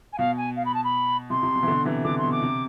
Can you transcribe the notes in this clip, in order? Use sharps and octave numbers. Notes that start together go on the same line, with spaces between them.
G#5
B2 F5
G#5
F5
B5
A5
B5
C3 C6
C3
B2
E3
B2 D3
C3 E3
B2 D3 D6
B2 C6
D6
C3